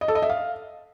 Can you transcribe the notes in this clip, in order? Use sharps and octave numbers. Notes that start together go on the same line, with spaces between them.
D#5
A4
D#5
E5
F5